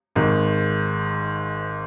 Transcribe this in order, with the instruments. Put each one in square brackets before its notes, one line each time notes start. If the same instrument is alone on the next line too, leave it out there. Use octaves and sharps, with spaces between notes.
[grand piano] G#1 G#2 D#3